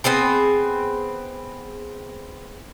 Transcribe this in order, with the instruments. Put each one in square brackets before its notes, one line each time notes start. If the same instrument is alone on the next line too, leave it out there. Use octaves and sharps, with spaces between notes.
[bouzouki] B3 C4 G#4 G5